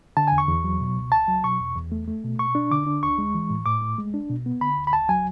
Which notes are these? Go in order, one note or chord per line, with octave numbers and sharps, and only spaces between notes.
D3 A5
E2 G#5
C#6
E2
F#3
B2
C#2
C#2 A5
F#3
B2 C#6
E2
E2
A3
A3
B2
B2 C#6
D4
D3 D6
D4
D2 C#6
G#3
E3
A2
A2 D6
A3
G#3
D4
B2
B3
D3 B5
D2
B5
D2 A5
F#3 G#5